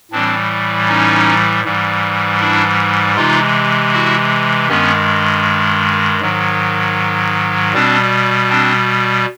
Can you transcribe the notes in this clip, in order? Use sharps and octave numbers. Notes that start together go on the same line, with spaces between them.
A2 E3 G3 C4 D4
C#4 D#4
G#2 E3 G3
D4 E4
C3 E3 G#3 D#4 F4
E4 F#4
G2 D#3 G#3 B3 C#4
G#2 D#3 F#3
B2 G3 C4 D4
C4 D4